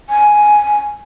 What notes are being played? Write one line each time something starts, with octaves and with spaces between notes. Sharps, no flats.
G#5